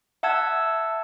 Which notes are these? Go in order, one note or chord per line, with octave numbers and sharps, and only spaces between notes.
E5 F#5 A5 E6 G#6